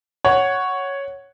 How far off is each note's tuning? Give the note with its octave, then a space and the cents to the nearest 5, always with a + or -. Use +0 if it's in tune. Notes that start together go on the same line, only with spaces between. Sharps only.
C#5 +0 F#5 +0